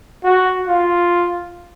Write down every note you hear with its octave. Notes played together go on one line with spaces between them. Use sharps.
F#4
F4